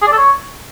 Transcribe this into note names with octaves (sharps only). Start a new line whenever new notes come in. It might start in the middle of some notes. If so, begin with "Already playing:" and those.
G#4
D5
A4
C#5